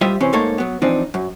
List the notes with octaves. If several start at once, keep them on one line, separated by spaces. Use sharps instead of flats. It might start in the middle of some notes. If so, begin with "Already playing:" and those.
G3 F4 G4 C5 D#5 E5
C3 E3 C4 C#4
G#2 A3 A#3 D#4 A4 C#5
F#3 B3
E3 F3 C4 D4 D#4
F#2